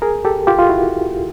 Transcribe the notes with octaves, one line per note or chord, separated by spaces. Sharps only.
G#4 A#4
G4 A4
F4 G4
F4
E4 F#4